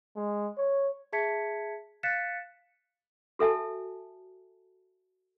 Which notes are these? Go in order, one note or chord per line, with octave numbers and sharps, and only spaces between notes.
G#3
C#5
G#4 E5 A5 G#6 B6 C#7
F5 F#6 A6 B6 C#7 E7
F#4 A4 E5 G#5 A5